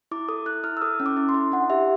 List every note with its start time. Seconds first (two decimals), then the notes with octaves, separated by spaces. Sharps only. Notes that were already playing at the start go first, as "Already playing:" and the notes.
0.11 E4 D6
0.29 A4 D#6
0.46 E4 F#6
0.64 E4 F6
0.77 E6
0.82 A4 D#6
1.00 C#4
1.06 D6
1.17 E4
1.29 C6
1.34 E4
1.52 D4 F#5
1.70 G4 E5